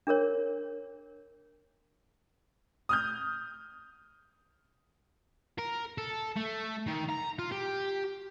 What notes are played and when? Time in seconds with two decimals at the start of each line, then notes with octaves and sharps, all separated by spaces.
0.07 D4 G#4 A#4 C#5
2.89 D#6 F6 G6
5.58 A#4
5.98 A4
6.37 A3
6.88 D#3
7.10 A#5
7.39 F4
7.52 G4